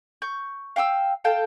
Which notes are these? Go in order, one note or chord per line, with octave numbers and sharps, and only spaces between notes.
C#6 G6
F5 G5 D6 E6
A4 F5 G5 A5